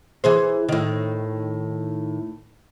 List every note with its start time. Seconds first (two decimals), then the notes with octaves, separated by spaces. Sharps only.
0.24 E3 G#4 C5
0.69 A2 D#3